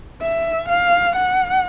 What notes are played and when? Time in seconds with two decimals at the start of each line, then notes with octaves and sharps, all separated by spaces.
0.22 E5
0.69 F5
1.16 F#5